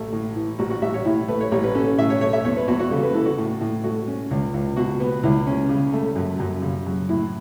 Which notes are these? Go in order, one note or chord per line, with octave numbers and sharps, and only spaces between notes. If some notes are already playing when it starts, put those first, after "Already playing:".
Already playing: A1 A3
A2
E3
A1 F#4
F#4
A1 E5
C#5
A2 E4
A3 B4
C#5
A1 C#5
B4
C#4 A4
A2 E5
C#5
A3 C#5
E5
E2 C#5
B4
E2 F#4
F#4
C#3 A4
B4
E3 A4
F#4
A2
A2
A3 F#4
C#4
C#2
C#2
B2 F#4
B3
C#2 E4
C#4
C#3
A3
F#2
F#2
C#3
F#3
A2 E4